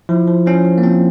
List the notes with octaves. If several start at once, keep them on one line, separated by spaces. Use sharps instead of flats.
F3 E4
F3
F3 C#4
F3
A#3
F3 C4